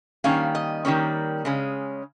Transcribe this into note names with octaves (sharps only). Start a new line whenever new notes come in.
D#3 G3 A#3 C#4 F5
D#5
D#3 G3 A#3 C#4
C#3 G#3 C#4